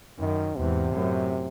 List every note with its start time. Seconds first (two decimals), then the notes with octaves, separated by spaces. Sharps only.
0.19 F#2 D#3
0.56 E2 G#2 C3
0.94 F#2 A2